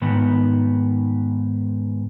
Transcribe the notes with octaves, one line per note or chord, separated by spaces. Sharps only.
G#2 D#3 B3